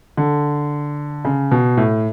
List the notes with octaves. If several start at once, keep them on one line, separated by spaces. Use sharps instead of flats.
D3
C#3
B2
A2